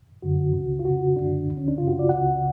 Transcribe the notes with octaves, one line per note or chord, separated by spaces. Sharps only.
F#2 D3 F#4
C#2 C#3
F4
F2 C#3 F#4
F#2 D3 D4
D2 D3
C#4
D4
F#2 C#3 F4
F#4
D5
C#2 C#3 F#5